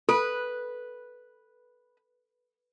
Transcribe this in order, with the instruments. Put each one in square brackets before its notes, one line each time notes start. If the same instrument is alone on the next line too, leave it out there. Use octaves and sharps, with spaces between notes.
[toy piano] A4 [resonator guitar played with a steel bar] B4